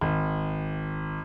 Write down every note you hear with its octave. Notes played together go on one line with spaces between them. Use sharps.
G#1